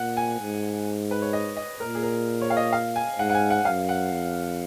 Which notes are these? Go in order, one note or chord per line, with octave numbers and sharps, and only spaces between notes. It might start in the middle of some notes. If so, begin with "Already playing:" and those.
Already playing: A#2 F#5
G#5
G#2
B4
C#5
D#5
D#5
A#2 A#4
G#4
A#4
C#5
F5
D#5
F5
G#5
G#2 F#5
F#5
G#5
F#5
F#2 F5
F#5
F2